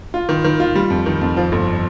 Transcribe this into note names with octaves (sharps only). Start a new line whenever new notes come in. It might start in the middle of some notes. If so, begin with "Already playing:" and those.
F4
D#3
D#3
F4
G3
F2
D#3
F2
F3
G1